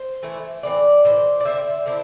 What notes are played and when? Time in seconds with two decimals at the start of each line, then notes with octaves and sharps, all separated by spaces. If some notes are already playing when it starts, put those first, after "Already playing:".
Already playing: C5
0.23 E3 A3 E4
0.63 A2 E3 C4 D5
1.05 A2 E3 C5
1.40 D5
1.45 D3 C4 E4 E5
1.86 D3 C4 E4